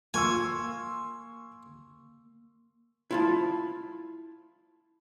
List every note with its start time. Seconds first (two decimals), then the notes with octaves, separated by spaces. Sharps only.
0.14 A#3 G#5 C6 C#6 E6
3.11 E4 F4 A5